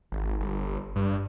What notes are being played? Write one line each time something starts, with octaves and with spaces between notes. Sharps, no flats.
G#1
G1
G2